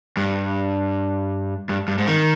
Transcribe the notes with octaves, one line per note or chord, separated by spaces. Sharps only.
G2
G2
G2
G#2
D#3